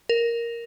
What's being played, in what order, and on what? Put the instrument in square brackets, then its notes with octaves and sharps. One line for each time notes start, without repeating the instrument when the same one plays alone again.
[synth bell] A#4